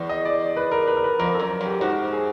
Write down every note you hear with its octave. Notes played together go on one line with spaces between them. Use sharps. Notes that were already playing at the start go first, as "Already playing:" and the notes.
Already playing: E2
D#5
D5
B4
A#4
B4
A#4
B4
F2 A#4
A4
F#2
F#2 G4
G#2 F#4
G#4